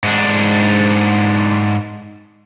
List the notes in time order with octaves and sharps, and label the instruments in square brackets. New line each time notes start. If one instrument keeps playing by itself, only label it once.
[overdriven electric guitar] G#2 D4